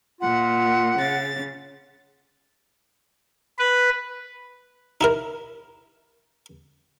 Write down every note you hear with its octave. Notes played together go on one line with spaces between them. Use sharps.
A#2 F4 F#5
C#3 A6
B4
D#4 E4 A#4